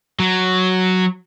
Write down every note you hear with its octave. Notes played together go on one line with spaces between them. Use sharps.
F#3